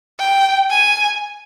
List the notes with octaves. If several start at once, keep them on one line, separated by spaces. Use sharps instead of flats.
G5
G#5